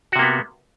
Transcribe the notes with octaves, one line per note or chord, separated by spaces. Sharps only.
C3 A#3 B3 F#4